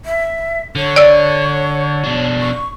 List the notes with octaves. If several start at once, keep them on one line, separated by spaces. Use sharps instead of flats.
E5
D3 C#5
D5 E6
B2 D4
C#6